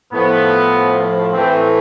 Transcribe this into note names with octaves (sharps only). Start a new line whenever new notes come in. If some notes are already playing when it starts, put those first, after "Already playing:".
A2 F3 B3
A2 E3 C4